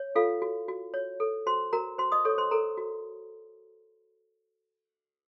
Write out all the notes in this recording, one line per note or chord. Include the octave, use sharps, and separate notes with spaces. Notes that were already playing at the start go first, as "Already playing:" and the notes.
Already playing: C#5
F4 A4 F5
F#4
F#4
C#5
A4
F#4 C5 C6
F#4 A#4 A#5
F#4 C5 C6
D#5 D#6
A4 C#5 C#6
C5 C6
A4 A#4 A#5
F#4